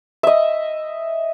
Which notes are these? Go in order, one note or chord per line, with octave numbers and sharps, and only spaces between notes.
D#5 E5